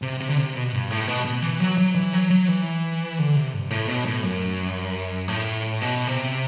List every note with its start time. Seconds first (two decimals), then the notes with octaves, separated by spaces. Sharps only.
0.02 C3
0.20 C3
0.29 D3
0.37 C3
0.55 B2
0.72 G2
0.90 A2
1.07 B2
1.25 B2
1.42 E3
1.60 F#3
1.78 F#3
1.95 E3
2.13 F#3
2.30 F#3
2.48 E3
3.19 D3
3.36 C3
3.53 G2
3.70 A2
3.88 B2
4.06 A2
4.23 F#2
5.28 A2
5.81 B2
6.07 C3